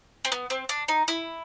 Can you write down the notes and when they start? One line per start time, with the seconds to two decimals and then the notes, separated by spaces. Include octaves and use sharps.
0.25 C4
0.32 B3
0.50 C4
0.69 D4
0.88 D#4
1.08 E4